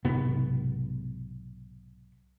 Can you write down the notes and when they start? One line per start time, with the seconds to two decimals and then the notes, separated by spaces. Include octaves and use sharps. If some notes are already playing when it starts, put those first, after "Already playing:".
0.05 B1 G#2 C3 B3